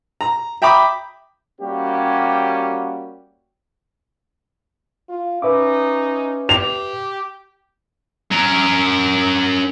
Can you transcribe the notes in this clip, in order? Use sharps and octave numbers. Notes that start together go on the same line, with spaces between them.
A#5
E5 G5 A#5 B5 D6 D#6
G3 A#3 C#4 F#4 G4
F4
C#4 D#4 B4 E5 D6
G4 F7
C#4 A#4